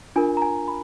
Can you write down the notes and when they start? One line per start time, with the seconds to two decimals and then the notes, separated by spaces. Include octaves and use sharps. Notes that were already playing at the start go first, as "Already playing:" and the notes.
0.16 D4 F4 A#4 G#5
0.37 A#5
0.42 G#5
0.68 B5